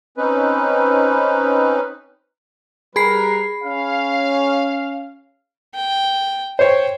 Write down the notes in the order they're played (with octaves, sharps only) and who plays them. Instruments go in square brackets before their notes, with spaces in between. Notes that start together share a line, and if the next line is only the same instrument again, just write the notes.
[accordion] C4 C#4 D#4 B4
[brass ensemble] G3 A#4 B4 [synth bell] G#4 B5 C7
[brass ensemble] C#4 F5
[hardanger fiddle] G5
[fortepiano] C5 C#5 [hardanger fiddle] G5